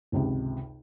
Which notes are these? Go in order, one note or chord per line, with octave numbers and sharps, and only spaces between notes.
G#1 C#2 C3